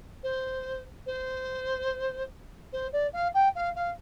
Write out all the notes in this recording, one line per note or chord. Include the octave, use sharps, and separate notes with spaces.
C5
C5
C5
D5
F5
G5
F5
F5